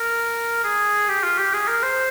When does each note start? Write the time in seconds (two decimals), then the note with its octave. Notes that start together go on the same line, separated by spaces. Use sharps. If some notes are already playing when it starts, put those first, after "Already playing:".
Already playing: A#4
0.64 G#4
1.08 G4
1.23 F4
1.38 G4
1.53 G#4
1.68 A#4
1.83 C5